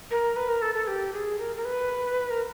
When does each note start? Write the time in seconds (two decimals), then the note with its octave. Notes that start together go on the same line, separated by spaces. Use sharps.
0.11 A#4
0.36 B4
0.49 A#4
0.62 A4
0.75 A4
0.87 G4
1.13 G#4
1.38 A#4
1.56 A#4
1.65 B4
2.31 A#4